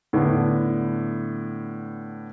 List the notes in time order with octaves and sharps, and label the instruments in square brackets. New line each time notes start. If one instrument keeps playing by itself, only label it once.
[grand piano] A2 D3 B3 D4